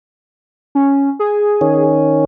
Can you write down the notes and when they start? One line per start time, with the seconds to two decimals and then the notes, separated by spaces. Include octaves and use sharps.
0.75 C#4
1.19 G#4
1.61 D#3 C#4